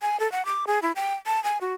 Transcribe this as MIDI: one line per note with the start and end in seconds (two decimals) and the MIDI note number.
0.02 0.19 80
0.20 0.30 69
0.32 0.45 78
0.46 0.65 86
0.67 0.79 68
0.82 0.92 64
0.96 1.15 79
1.26 1.42 81
1.44 1.58 80
1.61 1.74 66